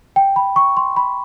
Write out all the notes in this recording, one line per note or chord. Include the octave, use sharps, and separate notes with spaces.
G5
B5
C#6
C6
B5